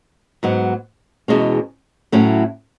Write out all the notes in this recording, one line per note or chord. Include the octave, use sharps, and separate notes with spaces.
G#2 F#3 B3
E2 B2 G#3 C#4
A2 F#3 A3 C#4